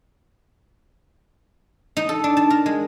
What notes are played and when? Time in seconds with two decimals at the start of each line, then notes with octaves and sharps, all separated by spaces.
1.97 D#4
2.09 A4
2.24 D4
2.37 A5
2.50 A#4
2.66 G#3